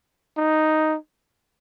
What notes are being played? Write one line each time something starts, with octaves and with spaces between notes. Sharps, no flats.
D#4